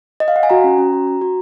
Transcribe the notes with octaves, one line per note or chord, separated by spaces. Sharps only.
D#5
F5
F#5
G#5
F#4 A#5
C#4
C#4
F#4
F#4
F#4